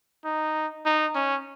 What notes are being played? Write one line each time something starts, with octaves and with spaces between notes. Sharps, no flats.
D#4
D#4
C#4